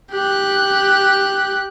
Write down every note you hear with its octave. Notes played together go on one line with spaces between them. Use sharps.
G4 F#6